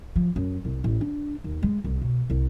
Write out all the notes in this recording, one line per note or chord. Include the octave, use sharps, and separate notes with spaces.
F3
F#2
C2
A1
D4
D#2
G#3
C2
B2
C2